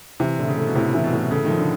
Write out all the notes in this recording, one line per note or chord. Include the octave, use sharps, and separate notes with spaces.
C3 E3
A2 D3
C#3
A3
B2
A2 C3
E3
B2
A2
C#3 A3
D#3
F3
D3